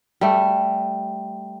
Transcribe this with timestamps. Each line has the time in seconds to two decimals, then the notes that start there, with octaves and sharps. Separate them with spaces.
0.21 G3 A3